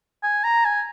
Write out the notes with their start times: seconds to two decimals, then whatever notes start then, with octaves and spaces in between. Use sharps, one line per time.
0.23 G#5
0.44 A#5
0.65 G#5